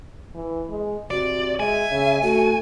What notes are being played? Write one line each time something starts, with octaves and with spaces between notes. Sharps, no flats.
E3
G#3
C3 F#4 D5
G#3 E5 G#5
C#3
A3 F#4